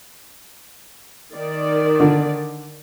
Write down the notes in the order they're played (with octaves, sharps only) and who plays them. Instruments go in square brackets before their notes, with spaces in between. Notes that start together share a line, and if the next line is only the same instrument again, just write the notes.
[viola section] D#3 D5
[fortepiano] D3